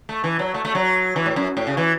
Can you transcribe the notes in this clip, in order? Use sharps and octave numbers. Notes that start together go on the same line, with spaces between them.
A3
E3
F#3
A3
A3
F#3
E3
A2
F#2
A2
C#3
E3